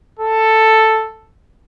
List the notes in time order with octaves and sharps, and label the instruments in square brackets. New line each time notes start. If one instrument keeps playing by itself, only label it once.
[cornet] A4